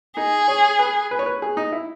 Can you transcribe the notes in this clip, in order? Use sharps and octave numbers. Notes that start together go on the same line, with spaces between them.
D#4 G#4
C#5
B4
B4
C#5
B4
G#4
D#4
E4